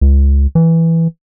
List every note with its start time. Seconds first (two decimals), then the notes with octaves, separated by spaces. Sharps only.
0.01 C#2
0.55 E3